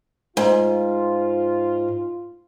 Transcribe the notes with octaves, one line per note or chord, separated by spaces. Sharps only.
G#2 F4